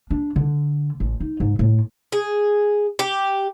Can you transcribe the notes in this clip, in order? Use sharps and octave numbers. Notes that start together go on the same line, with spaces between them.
D4
D3
A1
D#4
G#2
A2
G#4
G4